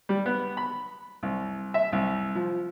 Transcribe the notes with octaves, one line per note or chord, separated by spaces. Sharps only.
G3
B3
B5
C2
E5
C2
F3